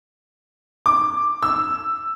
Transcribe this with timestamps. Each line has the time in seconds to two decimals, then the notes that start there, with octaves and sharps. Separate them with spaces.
0.86 D6
1.43 E6